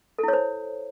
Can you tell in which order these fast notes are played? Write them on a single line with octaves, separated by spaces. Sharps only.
A4 E4 C#5 C5